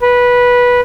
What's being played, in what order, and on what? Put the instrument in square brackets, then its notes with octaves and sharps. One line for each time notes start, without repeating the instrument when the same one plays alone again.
[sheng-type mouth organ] B4